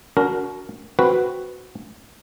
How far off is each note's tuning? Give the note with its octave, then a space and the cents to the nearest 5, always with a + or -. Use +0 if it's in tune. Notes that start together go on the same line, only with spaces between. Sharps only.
D4 -40 F#4 +0 A#4 +0
C4 +0 F#4 +0 B4 +0